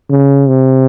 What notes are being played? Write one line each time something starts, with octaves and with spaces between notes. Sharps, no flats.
C#3
C3